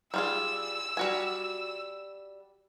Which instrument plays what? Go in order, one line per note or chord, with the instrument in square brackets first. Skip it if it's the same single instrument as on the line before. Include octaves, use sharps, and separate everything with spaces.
[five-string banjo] G3 F4 G#4 [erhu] E6
[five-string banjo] G3 F#4 G#5